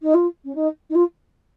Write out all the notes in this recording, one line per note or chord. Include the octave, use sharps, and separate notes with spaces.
D#4
F4
C#4
D#4
D#4
F4